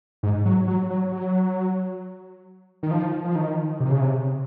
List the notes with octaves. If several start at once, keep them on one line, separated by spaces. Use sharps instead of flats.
G#2
F#3
F#3
F#3
F#3
D#3
F3
F3
D#3
C3
C#3
C3